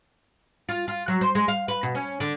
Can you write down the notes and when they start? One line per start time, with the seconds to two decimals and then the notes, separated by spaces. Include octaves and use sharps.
0.69 F4
0.88 F4
1.08 F#3
1.21 C5
1.35 G#3
1.48 F5
1.68 B4
1.83 B2
1.95 C#4
2.20 D3